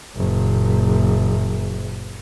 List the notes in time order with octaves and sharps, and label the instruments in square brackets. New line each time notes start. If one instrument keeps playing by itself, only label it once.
[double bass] F#1 A#2